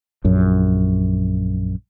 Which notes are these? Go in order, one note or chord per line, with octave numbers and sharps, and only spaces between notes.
A#1 F#2